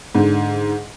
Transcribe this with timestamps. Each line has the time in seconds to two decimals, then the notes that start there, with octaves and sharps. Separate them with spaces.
0.15 G#2 D3